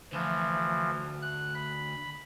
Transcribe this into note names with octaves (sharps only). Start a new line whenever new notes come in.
D2 E3 F3
F#6
B5